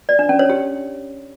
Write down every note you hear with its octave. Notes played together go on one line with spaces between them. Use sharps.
D5
D4
C#4
C#5
G4